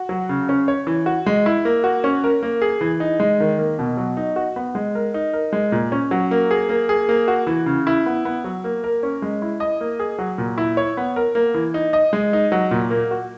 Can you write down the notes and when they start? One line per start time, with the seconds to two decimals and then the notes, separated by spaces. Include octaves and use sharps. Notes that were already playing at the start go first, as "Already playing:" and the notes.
Already playing: F#4
0.09 F#3
0.29 C#3
0.49 C#4
0.68 C#5
0.87 E3
1.06 F#4
1.26 G#3
1.46 E4
1.65 A#3
1.84 F#4
2.04 C#4
2.24 A#4
2.43 A#3
2.62 G#4
2.81 E3
3.00 D#4
3.20 G#3
3.40 D#3
3.59 A#3
3.79 B2
3.97 F#3
4.17 D#4
4.36 F#4
4.56 B3
4.75 G#3
4.95 A#4
5.14 D#4
5.33 A#4
5.53 G#3
5.72 A#2
5.92 C#4
6.11 F#3
6.31 A#3
6.51 G#4
6.69 A#3
6.89 G#4
7.09 A#3
7.28 F#4
7.47 E3
7.66 C#3
7.87 E4
8.06 B3
8.25 B3
8.44 F#3
8.64 A#3
8.84 A#4
9.03 C#4
9.22 G#3
9.42 E4
9.60 D#5
9.81 A#3
9.99 G#4
10.18 F#3
10.38 A#2
10.58 E4
10.77 C#5
10.97 B3
11.16 A#4
11.35 A#3
11.54 E3
11.74 D#4
11.93 D#5
12.13 G#3
12.33 D#4
12.52 F#3
12.71 A#2
12.90 A#3
13.11 F#4